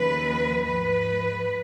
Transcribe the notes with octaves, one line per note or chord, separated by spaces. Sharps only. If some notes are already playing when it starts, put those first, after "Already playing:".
Already playing: D#2 C#3 F3 B4
G#2 F3 B4